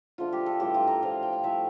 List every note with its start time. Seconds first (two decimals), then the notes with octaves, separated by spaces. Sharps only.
0.18 D3 F3 A3 F4
0.33 G4
0.46 A4
0.60 A2 E3 G3 G4
0.74 F4
0.87 A#4
1.02 A2 F3 A3 F5
1.23 G5
1.33 F5
1.43 A2 F3 A3 E5